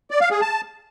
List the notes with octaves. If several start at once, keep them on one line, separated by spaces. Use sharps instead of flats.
D5
F5
G#4
A5